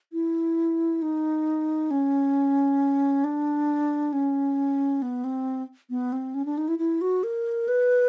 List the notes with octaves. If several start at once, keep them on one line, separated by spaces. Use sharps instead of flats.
E4
D#4
C#4
D4
C#4
B3
C4
B3
C4
C#4
D4
D#4
E4
E4
F#4
A#4
B4